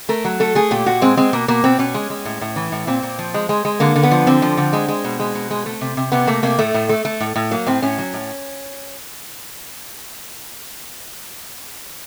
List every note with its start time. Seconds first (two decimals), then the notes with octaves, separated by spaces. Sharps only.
0.09 A3 A#4
0.25 F#3
0.40 A3 A4
0.55 A3 G#4
0.71 A#2 G4
0.86 A#2 F#4
1.02 G#3 C4
1.17 G#3 C4
1.33 B2 A#3
1.48 B2 A#3
1.64 B2 C4
1.79 B2 C#4
1.94 G#3
2.10 G#3
2.25 A2
2.41 A2
2.56 E3
2.72 A2
2.87 A#2 C4
3.03 A#2
3.19 F3
3.34 G#3
3.49 G#3
3.65 G#3
3.80 D3 A#3
3.96 D3
4.03 B3
4.11 F3
4.27 D3 C4
4.42 F3
4.57 D3
4.73 G#3
4.88 G#3
5.04 B2
5.20 G#3
5.35 B2
5.51 G#3
5.66 A3
5.81 C3
5.97 C3
6.12 C3 B3
6.27 A3 A#3
6.43 C3 A#3
6.59 A2 A3
6.74 A2
6.89 A3
7.05 A3
7.20 A2
7.36 A2
7.51 F#3 A#3
7.67 A2 C4
7.82 A2 C#4
7.98 F#3
8.13 A2